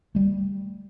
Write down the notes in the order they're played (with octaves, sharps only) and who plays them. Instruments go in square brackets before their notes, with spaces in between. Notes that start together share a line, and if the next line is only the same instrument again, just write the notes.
[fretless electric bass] G3 A3